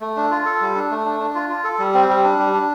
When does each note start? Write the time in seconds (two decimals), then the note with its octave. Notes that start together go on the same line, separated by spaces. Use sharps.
0.01 A3
0.16 D4
0.31 F4
0.46 A4
0.61 G3
0.75 D4
0.90 A3
1.05 D4
1.20 D4
1.35 F4
1.50 F4
1.64 A4
1.79 G3
1.94 C4
2.09 G3
2.24 D4
2.38 G3
2.53 D4